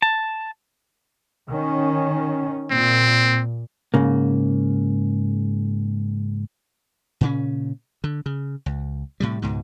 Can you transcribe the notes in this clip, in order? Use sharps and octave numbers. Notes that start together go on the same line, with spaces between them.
A5
D#3 C#4
A#2 C4
G#2 C#3 A#3
A#2 C#3 C#4
D3
C#3
C#2
A2 C3 G3
C#2 G#2 B2